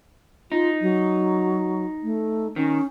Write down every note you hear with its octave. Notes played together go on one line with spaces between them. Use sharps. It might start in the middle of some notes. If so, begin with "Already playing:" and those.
D#4 F4
F#3
A3
D#3 C#4